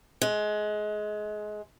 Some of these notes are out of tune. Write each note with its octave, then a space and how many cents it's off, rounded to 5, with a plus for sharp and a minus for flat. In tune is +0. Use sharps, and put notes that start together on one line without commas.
G#3 +25